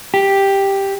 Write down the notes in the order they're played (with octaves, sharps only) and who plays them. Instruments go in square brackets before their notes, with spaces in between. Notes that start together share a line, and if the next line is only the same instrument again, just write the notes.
[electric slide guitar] G4